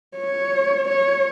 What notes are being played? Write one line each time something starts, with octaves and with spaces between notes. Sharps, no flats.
C#5
C#5